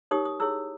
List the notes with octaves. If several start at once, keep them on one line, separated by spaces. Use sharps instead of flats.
D#4 G4 A#4 C#5 D#6
D#6
E4 G#4 C#5 E6